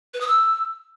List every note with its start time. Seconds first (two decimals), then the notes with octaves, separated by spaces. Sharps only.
0.14 B4
0.21 D#6
0.28 E6